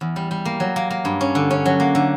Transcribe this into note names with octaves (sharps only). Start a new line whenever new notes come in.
E2
G3
G3
A#3
F#3
A#3
A#3
G2
C#4
D3
C#4
F#3
A#3
D3